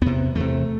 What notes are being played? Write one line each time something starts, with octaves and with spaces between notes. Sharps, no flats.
E2 C3 B3
E2 C3 A3